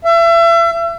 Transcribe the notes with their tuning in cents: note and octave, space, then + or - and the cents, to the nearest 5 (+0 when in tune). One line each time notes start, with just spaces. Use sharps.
E5 +35